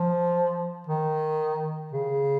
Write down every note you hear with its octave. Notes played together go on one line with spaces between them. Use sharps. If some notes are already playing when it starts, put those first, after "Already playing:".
Already playing: F3
D#3
C#3